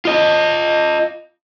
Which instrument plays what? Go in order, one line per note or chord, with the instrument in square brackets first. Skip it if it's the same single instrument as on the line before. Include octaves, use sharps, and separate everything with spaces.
[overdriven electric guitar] F4 D#5